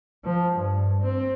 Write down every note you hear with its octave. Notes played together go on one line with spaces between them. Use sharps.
F3
G2
C4